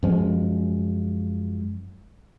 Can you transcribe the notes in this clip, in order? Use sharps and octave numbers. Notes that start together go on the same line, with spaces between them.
F#2 F3 G#3